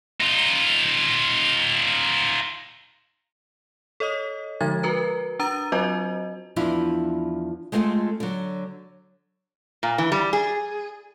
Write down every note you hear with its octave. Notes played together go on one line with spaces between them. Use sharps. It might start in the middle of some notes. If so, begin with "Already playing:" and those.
D#4 F4
A4 C#5 D#5 D#6
D3 F3 G#3 D#4 G#6 A6
F#4 A#4 B4 A#5
D4 A#5 D#6 A6 D#7
F#3 C4 F4 F#4 C5 D#5
E2 F3 D4 E4 F4
G#3 A3 C4 F4 G#4 A4
D3 F#3
A#2
E3
G3
G#4